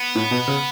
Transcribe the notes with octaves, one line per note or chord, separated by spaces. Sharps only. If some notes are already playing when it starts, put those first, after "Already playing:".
Already playing: B3
A2
B2
C#3